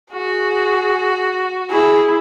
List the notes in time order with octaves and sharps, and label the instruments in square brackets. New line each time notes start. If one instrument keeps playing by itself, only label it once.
[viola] F#4 [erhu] G#4
[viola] E4 [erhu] G#4